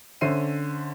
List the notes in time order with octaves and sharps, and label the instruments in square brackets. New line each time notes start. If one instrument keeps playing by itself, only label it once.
[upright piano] D3 C#4 C5 E5 C7 D#7